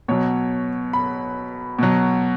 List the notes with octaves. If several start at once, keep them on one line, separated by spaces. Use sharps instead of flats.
B2 F#3 C#5
B5
B2 F#3